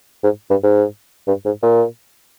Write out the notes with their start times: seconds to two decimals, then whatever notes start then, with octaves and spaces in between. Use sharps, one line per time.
0.24 G#2
0.50 G2
0.63 G#2
1.27 G2
1.45 G#2
1.63 A#2